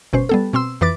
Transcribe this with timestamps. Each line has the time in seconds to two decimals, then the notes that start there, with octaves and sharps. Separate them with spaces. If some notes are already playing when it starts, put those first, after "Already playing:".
0.13 G1 B2 C#4 C5
0.29 G3 B3 A4
0.53 B2 C4 C6 E6
0.81 F2 E3 B4 D6 A6